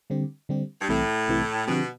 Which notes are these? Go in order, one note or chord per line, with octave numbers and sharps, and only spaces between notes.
D3 G3 C4 G4
D3 G3 C4 G4
G2
C2 A2 C3 E3 A3
C2 C3 E3 A3
B2 D3 F3 C4 G4